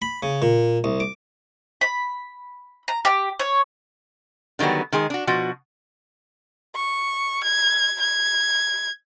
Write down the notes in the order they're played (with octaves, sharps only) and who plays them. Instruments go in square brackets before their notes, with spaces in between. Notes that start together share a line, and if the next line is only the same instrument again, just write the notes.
[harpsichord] B5
C#3
A#2
C2
D6
[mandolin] B5
A#5
G4
C#5
[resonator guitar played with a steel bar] D3 D#3 F#3 G3 B3
D#3 G#3 G#4
D4 F#4
B2 F3 F#4
[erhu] C#6
G#6
G#6